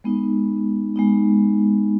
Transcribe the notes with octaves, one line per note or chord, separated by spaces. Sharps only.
G#3 B3 D#4
G#3 B3 D#4